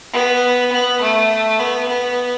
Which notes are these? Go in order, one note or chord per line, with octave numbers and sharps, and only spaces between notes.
B3
B3
A3
B3
B3